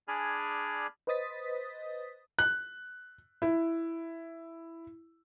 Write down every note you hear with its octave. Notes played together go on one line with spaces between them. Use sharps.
D4 G#4 D5 G#5 B5 F6
B4 C5 D#5 D#6 A6 B6
F#6
E4